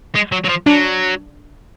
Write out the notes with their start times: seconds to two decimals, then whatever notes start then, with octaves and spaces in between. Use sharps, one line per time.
0.15 G#3
0.32 F#3
0.45 F#3
0.49 F3
0.66 F#3 D4